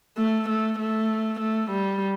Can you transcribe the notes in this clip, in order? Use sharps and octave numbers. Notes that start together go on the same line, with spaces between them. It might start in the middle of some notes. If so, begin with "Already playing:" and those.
A3
A3
A3
A3
G3